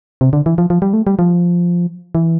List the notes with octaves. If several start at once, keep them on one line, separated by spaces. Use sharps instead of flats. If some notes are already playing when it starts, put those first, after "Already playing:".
C3
D3
E3
F3
F3
G3
A3
G3
F3
E3